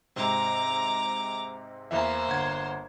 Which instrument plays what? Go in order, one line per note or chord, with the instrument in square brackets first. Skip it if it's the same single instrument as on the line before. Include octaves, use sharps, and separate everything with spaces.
[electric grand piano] G#2 C3 C4 [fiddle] A#5 D6
[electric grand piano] E2 E3 E5 [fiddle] A#3 C5
[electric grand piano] G1 F#5 G#6